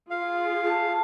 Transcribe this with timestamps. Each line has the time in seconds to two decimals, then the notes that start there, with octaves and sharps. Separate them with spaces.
0.11 F4 G#4 F5
0.64 A3 A5